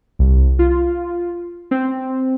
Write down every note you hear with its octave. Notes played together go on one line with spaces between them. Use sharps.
C2
F4
C4